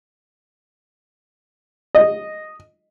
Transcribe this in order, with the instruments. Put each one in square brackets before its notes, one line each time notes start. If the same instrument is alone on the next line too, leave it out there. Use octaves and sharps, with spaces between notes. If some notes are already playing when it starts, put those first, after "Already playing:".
[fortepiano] D#5